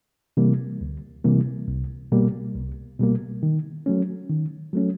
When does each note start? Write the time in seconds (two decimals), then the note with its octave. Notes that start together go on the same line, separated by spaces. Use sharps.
0.37 C3 E3 G3 A#3
0.81 D2
1.24 C3 E3 G3 A#3
1.68 C2
2.12 B2 G3 A#3
2.56 C2
2.99 B2 G3 A#3
3.43 D#3
3.86 F#3 A3 C#4
4.30 D#3
4.73 F#3 A3 C#4